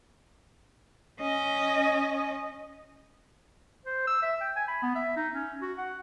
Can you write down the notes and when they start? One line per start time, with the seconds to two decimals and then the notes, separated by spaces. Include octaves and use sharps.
1.20 C#4 D#5
3.86 C5
4.07 E6
4.22 E5
4.41 G5
4.56 G#5
4.68 B5
4.82 B3
4.96 E5
5.16 D#4
5.33 C#4
5.61 F#4
5.78 F#5